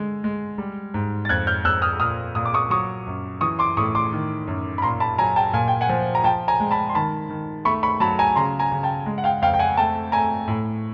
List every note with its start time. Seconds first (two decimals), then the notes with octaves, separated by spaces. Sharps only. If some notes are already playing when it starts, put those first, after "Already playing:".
Already playing: D3 G#3
0.24 G#3
0.58 G3
0.94 G#2
1.25 A6
1.29 F2 F#6 G#6
1.47 F6 G6
1.65 F2 E6 F#6
1.82 D#6 F6
2.00 A#2 D#6 F6
2.35 A#2 D#6
2.45 D6
2.54 C#6 D#6
2.70 F#3 C#6 D#6
3.07 F#2
3.41 E3 C#6 D#6
3.59 C6 D6
3.77 A2 C#6 D#6
3.95 C6 D6
4.13 D#3
4.47 F#2
4.78 B5
4.82 A#2 A#5 C6
5.00 A5 B5
5.18 F#3 G#5 A#5
5.36 G5 A5
5.53 A#2 G#5
5.68 G5
5.81 F#5 G#5
5.89 F3
6.15 A#5
6.24 F3 G5 A5
6.48 G#5 A#5
6.60 G#3
6.71 A5 B5
6.89 C6
6.95 D#3 A5 B5
7.30 D#3
7.65 A3 B5 C#6
7.83 B5 C#6
8.00 F#3 A5 B5
8.19 G#5 A#5
8.35 C#3 A#5 C6
8.59 G#5 A#5
8.72 C#3
8.83 G5 A5
9.06 G#3
9.18 F#5
9.24 F5 G5
9.42 F2 F5 G5
9.54 G5
9.59 F#5 G#5
9.77 A3 G5 A5
10.12 A3 G#5 A#5
10.48 A2